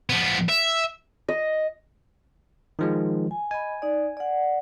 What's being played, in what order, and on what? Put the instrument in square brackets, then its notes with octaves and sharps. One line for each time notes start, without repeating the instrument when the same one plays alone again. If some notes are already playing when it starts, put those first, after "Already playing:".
[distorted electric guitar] F3 B3
E5
[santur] D#5
[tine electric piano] D#3 F3 G#3
[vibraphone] G#5
[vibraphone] D#5 B5 [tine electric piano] G#5
[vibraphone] D#4 D5
D5 F#5